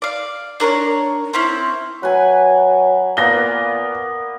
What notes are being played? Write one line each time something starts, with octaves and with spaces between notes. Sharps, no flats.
D5 F5
D4 A#4 B4 C#5
C4 C#4 E4
F#3 B4 G#5
A#2 A#3 B3 B4 F5 A#6 G7